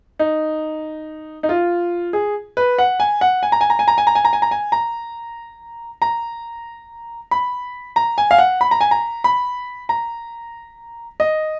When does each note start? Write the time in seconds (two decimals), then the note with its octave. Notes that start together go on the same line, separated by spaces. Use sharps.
0.19 D#4
1.43 D#4
1.49 F4
2.13 G#4
2.57 B4
2.78 F#5
3.00 G#5
3.21 F#5
3.43 G#5
3.52 A#5
3.61 G#5
3.70 A#5
3.79 G#5
3.88 A#5
3.98 G#5
4.07 A#5
4.15 G#5
4.25 A#5
4.33 G#5
4.42 A#5
4.51 G#5
4.72 A#5
6.02 A#5
7.31 B5
7.96 A#5
8.18 G#5
8.31 F5
8.38 F#5
8.61 B5
8.71 A#5
8.81 G#5
8.91 A#5
9.24 B5
9.89 A#5
11.20 D#5